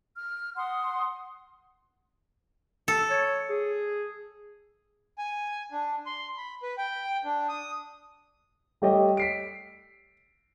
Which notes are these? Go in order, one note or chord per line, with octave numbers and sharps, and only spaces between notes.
F6
F#5 C6 D#6
A4
C#5
G#4
G#5
D4
C6
B5
B4
G5
D4
D#6
G3 A3 G4 C#5 D#5
B6 C7 D7